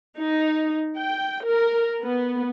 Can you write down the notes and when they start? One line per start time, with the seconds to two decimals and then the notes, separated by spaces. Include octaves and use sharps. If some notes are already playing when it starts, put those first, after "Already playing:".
0.19 D#4
0.97 G5
1.45 A#4
2.03 B3